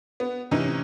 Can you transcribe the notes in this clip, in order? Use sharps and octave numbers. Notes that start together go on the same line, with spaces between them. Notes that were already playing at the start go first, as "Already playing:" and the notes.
B3
A2 C3 E3 C#4 D#4